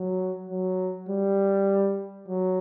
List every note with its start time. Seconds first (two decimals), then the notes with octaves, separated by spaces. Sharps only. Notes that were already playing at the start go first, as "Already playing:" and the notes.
Already playing: F#3
0.50 F#3
1.09 G3
2.28 F#3